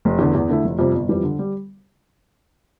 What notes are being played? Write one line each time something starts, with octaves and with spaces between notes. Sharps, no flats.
F1
E2 D3
E2
D3 A3 E4
F1
F2 C3 G3 C4
G1
F2 E3 G3
D3
G3